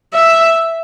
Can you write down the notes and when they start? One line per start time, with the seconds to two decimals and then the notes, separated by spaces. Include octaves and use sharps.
0.14 E5